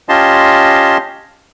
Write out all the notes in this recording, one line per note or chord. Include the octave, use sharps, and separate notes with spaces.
C#4 F4 G4 D#5 A5 C6